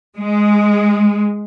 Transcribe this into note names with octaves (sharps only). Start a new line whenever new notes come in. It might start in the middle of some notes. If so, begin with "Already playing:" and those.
G#3